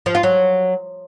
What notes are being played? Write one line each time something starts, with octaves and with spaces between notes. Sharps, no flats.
F3
F4
F#3